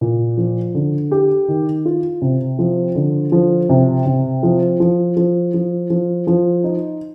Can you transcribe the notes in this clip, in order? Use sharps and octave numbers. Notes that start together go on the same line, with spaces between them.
A#2
F3
D3
G4
D#3
F4
C3
F3
D3
F3
C3
C3
F3
F3
F3
F3
F3
F3
D#4